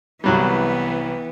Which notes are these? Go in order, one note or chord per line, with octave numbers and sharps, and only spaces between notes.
C2 E3 F#3 G3 B3